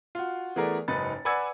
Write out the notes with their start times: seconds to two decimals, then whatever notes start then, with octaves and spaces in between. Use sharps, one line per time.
0.15 F4 F#4
0.56 E3 A3 B3 G#4 A#4 D5
0.88 F#1 G#2 D#4 B4 A6
1.25 B4 D5 F#5 G#5 E6 G#6